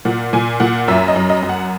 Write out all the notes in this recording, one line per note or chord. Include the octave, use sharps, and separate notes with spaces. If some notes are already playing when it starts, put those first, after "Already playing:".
A#2 F#5
A#2 G#5
A#2 F#5
F#2 E5
D#5
F#2
D#5
F#2
F#5